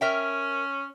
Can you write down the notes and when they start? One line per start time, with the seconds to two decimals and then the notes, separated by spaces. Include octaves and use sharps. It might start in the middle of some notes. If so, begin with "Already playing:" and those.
0.01 C#4 A#4 E5 G5